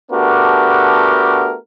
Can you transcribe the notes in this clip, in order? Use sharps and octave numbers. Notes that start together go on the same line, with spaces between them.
A3 B3 D4 F#4 G4 A#4